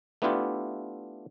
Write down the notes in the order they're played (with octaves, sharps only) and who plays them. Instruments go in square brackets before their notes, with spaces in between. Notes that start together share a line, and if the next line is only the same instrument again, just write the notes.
[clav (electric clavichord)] A3 B3 D4 E4 F4 G4